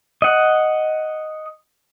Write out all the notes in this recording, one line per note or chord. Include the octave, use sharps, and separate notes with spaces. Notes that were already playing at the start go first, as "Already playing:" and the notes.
D#5 F#5